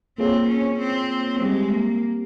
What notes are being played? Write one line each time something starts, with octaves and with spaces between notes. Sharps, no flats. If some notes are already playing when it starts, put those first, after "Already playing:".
A#3 C4 F4 G#4 C#5
C#4
C4
G3 G#3 C4 G4
A#3